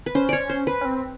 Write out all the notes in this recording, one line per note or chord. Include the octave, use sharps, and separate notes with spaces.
B4
C#4 C5
C#5 D5
C5
B4
C#4
C4